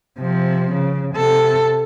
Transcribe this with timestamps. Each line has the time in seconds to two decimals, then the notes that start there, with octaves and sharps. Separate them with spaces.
0.19 C3 F3
0.73 C#3
1.15 C3 A4